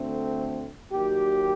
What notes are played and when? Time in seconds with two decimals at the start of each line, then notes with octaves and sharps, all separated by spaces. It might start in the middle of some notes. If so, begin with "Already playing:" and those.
Already playing: D2 D3 A3 C4
0.91 D#2 D#3 F#3 G4